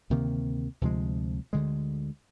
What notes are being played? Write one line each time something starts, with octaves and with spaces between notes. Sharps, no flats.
D2 C3 D#3 A#3
D2 C3 F3 G#3
D2 D3 G#3